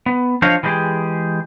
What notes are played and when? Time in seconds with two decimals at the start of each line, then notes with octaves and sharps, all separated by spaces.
0.06 B3
0.42 F3 D4 C5 C#5 D#5 F5
0.63 E3 F#3 G#3 D#4 G4 G#4